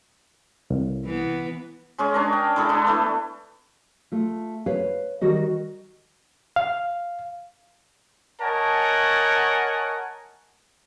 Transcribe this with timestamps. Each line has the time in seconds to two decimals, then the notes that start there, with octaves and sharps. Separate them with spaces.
0.70 C2
1.05 E3 B3
1.98 G#3 C#4 G#4
2.14 C#4 D4 A#4
2.33 G5
2.56 G#3 E4 G#4 A4
2.69 D4 E4
2.87 E3 A3 B3
4.12 A3 F4
4.66 B4 C#5 F5
5.21 D#3 G3 F#4 D#5
6.56 F5
8.41 A#4 C#5 D#5 F#5 G#5 A5